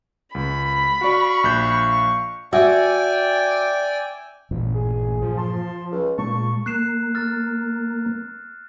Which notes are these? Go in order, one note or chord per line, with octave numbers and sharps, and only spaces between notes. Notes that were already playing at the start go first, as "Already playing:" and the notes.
C#2 B5
F#4 D5 F5 C#6
A#1 F#6 G6
F#4 D5 E5 G5 G#5
A1 G2 A#2 E3
G#4
F3
A5 C6
C#2
A#2 G#3 A5 C#6
A#3 F#6 C7 E7
F6 A6